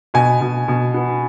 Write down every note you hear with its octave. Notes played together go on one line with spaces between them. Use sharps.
B2 G#5
B2
B2
B3